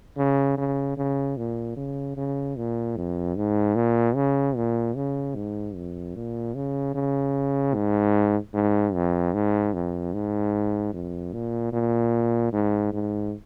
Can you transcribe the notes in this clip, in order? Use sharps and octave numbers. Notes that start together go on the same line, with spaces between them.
C#3
C#3
C#3
A#2
C#3
C#3
A#2
F2
G#2
A#2
C#3
A#2
C#3
G#2
F2
A#2
C#3
C#3
G#2
G#2
F2
G#2
F2
G#2
F2
A#2
A#2
G#2
G#2